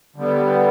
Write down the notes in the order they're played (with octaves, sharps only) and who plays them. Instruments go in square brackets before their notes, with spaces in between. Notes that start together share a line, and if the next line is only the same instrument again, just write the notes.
[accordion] D3 G3 B3